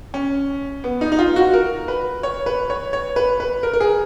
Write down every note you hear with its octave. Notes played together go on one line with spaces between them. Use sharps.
C#4
B3
D#4
D#4
F4
F#4
A#4
B4
C#5
B4
C#5
C#5
B4
B4
A#4
A#4
G#4